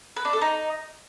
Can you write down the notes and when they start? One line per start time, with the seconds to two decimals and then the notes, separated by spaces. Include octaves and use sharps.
0.16 B4
0.25 D4
0.33 A4
0.41 D#4